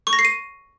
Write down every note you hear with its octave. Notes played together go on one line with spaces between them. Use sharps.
C#6
A#6
C7
D#7